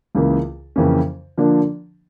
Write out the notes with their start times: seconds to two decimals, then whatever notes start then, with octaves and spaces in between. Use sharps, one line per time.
0.15 C#2 C#3 E3 A#3
0.76 F2 C#3 E3 A#3 C#4
1.37 D3 F3 A#3 D4